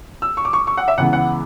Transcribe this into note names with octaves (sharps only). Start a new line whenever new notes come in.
E6
C#6
D6
C#6
C#6
F#5
E5
C#2 C#3 E3 B3 F#5
F#5